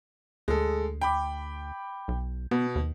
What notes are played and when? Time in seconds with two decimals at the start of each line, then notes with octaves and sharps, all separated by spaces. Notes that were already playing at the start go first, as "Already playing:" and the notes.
0.48 D2 G#3 A4
1.01 G5 B5 D6
2.08 B1
2.51 B2 B3
2.75 D#2